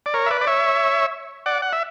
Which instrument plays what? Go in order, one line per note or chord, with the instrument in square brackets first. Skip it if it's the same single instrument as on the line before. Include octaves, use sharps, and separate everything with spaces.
[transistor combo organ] D5
A#4 C#5
E5
B4 D5
D5
C#5 E5
D5 F#5
F#5
E5